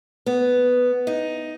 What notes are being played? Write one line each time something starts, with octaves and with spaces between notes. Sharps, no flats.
B3
D#4